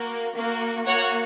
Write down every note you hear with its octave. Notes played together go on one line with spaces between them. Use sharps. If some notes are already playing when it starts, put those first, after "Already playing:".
Already playing: A#3 F#4
A#3 F#4
A#3 F#4 C#5 F#5